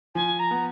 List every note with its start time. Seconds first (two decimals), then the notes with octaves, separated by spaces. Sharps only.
0.15 F3 G#5
0.39 A#5
0.51 B3